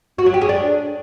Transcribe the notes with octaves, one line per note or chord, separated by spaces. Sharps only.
F#4
F#3
G4
G#4
D4